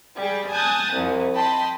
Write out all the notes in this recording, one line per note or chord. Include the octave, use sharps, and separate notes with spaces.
G3 G#4 G5
G#5 A5 D#6 F#6 G6 A6
C2 F2
D#5 G5 A5 B5 C6